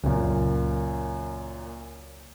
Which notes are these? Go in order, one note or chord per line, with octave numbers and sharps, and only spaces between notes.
C#2 F#2 A#2